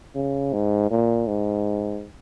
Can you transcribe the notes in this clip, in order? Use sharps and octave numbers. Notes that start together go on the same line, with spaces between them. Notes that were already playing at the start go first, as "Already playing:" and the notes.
C#3
G#2
A#2
G#2